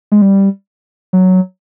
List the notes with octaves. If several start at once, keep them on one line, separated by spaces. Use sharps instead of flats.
G#3
G3
F#3